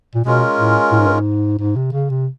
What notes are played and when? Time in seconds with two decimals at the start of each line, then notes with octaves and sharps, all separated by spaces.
0.15 A#2
0.25 B2 G#3 C#4 F4 A#4
0.58 A2
0.92 A2
1.00 G#2
1.07 G2
1.13 G#2
1.59 G#2
1.76 C3
1.93 C#3
2.10 C3